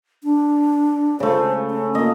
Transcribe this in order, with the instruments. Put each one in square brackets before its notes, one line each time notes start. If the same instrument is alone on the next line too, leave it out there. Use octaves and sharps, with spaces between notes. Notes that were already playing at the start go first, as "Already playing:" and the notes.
[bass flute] D4
[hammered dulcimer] C#3 A3 [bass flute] C5
[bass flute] C#4
[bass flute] A#3 [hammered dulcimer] D#5